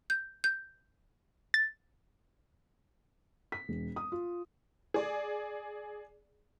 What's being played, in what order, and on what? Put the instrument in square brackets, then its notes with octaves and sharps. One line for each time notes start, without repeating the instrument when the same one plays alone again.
[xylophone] G6
G6
[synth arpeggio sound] A6
[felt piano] B6
E1
D#6
F4
[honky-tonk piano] G#4 D5